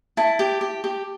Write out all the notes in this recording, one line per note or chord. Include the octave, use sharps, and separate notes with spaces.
E4 A5
G4
G4
G4